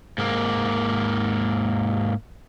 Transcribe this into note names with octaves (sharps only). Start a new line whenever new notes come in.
G#2 A#3